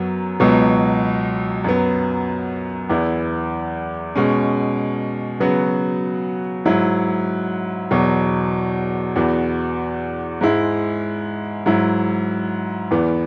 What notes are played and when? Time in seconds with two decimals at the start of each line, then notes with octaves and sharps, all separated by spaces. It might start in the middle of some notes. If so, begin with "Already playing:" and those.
Already playing: F#2 F#3 B3
0.40 C#2 B2 F#3 B3
1.64 F#2 F#3 B3
2.90 E2 E3 B3 E4
4.16 B2 G#3 C#4
5.40 C#3 F#3 B3 F#4
6.66 G#2 F#3 E4
7.91 E2 B2 F#3
9.16 E2 E3 B3 F#4
10.41 G#2 G#3 E4
11.66 G#2 F#3 E4
12.91 E2 E3 B3